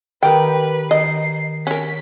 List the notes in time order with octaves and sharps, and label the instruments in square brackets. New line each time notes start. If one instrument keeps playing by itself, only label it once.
[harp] D#3 G4 A#4 [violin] B4 [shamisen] G5
[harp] D#3 [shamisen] D#5 [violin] C7
[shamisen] C#4 A#4 [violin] B6